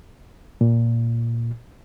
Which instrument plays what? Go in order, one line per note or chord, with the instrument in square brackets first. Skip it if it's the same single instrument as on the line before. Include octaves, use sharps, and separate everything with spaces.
[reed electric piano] A#2